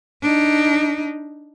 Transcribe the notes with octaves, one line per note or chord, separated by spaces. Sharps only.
D4 D#4